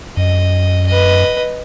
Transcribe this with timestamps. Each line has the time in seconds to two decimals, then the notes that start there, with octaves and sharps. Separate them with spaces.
0.17 F#2 D#5
0.86 B4 D#5